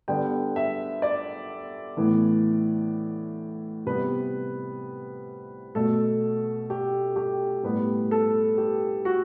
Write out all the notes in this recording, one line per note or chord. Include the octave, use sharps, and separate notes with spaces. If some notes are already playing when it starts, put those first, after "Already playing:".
D3 G3 B3 G5
E5
D5
A2 E3 B3
C3 G3 B3 B4
B2 A3 A4
G4
G4
A2 G3 B3 B4
A4
G4
F#4